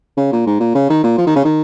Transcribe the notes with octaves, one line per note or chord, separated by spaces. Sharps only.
C#3
A#2
G#2
A#2
C#3
D#3
A#2
F3
D#3
C#3
D#3